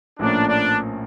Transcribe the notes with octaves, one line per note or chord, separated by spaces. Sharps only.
A#1 A2 F3 A#3 C#4 D4
D4